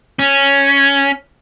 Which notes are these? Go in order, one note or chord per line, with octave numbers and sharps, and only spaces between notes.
C#4